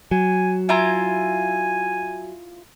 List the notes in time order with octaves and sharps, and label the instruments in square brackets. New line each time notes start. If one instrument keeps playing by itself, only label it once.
[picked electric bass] F#3 [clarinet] G#5
[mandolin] E4 F4 A#5 [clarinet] G#5